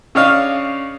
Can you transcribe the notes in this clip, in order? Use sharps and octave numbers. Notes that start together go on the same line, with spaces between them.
C#3 D4 C#5 D#5 F5